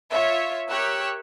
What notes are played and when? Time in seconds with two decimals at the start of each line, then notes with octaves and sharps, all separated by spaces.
0.11 F4 C#5 E5
0.70 G4 A#4 C#5 E6 F#6